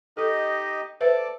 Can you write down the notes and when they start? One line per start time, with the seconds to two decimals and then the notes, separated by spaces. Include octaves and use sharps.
0.17 D#4 G4 A4 D#5
1.01 A4 B4 C5 D5 E5 D6